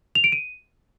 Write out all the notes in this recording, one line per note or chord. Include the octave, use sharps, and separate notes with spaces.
F7
D7
D#7